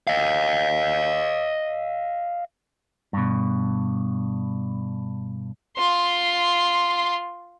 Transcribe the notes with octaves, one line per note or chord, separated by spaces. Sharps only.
D#5 F5
G2 B2
F4 C6